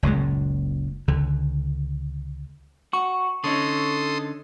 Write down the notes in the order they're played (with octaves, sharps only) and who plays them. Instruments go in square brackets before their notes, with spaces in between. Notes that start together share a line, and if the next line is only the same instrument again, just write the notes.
[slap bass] F#1 C#2 A#2 G#3
C#2 D3
[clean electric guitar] F#4 [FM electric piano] C#6
[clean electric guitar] D3 C#4 D#4 [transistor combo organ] A4 C6 D#6